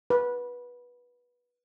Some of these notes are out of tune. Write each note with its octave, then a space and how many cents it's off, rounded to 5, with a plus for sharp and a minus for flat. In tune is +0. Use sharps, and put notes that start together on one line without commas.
B4 -20